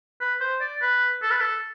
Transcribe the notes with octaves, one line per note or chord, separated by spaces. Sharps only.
B4
C5
D5
B4
A4
B4
A4